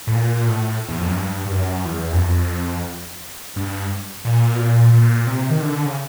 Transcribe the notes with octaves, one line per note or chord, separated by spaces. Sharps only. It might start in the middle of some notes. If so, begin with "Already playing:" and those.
A2
A#2
A2
E2
F2
F#2
G2
G2
F#2
E2
F#2
F2
G2
A#2
B2
A#2
A#2
C3
D#3
D3
C#3